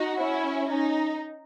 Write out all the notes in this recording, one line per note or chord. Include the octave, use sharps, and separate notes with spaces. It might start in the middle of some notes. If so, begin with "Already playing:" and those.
Already playing: D#4 F#4
C#4 E4
D#4